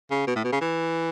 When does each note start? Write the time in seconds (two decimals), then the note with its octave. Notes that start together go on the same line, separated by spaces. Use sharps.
0.11 C#3
0.27 B2
0.36 A2
0.44 B2
0.52 C#3
0.61 E3